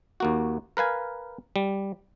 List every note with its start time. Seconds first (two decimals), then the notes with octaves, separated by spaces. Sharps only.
0.20 D#2 A#3 F#4
0.77 A#4 B4 F5 G#5
1.56 G3